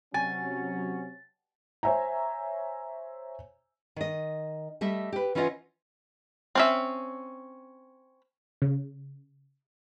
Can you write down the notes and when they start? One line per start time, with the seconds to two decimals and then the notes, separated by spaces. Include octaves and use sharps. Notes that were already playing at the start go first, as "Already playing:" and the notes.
0.14 C3 F#3 C#4 G#5 A6
1.83 C5 C#5 E5 G#5 A#5
3.96 D#3 D#5
4.81 G3 A3 D#5 E5
5.13 G4 B4
5.35 E3 C#4 E4 F4 D#5 F#5
6.55 C4 C#4 E5
8.62 C#3